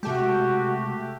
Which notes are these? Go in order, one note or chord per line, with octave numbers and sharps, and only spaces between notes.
C3 G#3 A3 F#4 G4